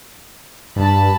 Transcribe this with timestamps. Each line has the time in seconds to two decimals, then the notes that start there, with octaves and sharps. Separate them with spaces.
0.76 G2 A5 B5